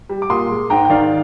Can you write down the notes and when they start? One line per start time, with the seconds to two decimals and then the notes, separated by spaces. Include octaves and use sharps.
0.09 G3
0.22 D6
0.30 A#2 C6 D#6
0.49 G#3
0.70 G#2 G5 A#5
0.85 G5
0.89 D#3 D5 F5